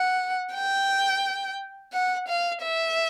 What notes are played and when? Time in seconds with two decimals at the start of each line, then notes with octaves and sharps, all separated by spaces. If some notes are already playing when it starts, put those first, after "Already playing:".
Already playing: F#5
0.54 G5
1.93 F#5
2.28 F5
2.62 E5